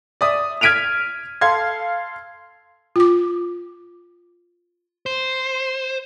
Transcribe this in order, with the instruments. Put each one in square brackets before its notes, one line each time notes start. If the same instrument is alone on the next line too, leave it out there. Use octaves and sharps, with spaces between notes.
[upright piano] D5 E5 D#6
F6 G#6 B6 D7 D#7 F7
A4 F5 C6 G#6
[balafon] F4 D6
[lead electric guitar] C5